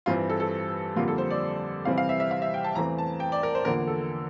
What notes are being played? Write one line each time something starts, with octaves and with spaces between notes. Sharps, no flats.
G2 E3 G3 C4 F4
A4
A4
F2 D3 G3 A#3 F4
A4
C5
D5
C3 E3 G3 C4 F5
F5
E5
E5
F5
E5
G5
A5
E2 E3 A3 C4 A#5
A5
G5
D5
A#4
C5
E2 D3 F3 A#3 A#4
A4